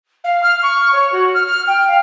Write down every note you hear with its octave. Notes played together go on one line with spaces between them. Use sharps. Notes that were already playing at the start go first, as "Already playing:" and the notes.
F5
F6
C#6
C#5
F#4
F6
F6
G5
F5